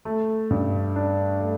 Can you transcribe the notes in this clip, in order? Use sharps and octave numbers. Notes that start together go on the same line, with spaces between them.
A3
G2
D4
A3